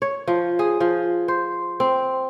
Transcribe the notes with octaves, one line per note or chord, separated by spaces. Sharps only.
C#5
F3
G#4
F3
C5
C4